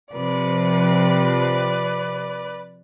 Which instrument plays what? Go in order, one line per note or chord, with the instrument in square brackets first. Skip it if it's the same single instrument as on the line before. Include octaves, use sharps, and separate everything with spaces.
[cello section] C3 F3 [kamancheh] B4 D5